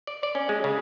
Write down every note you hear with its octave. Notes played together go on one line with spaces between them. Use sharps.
D5
D5
C#4
G#3
C#3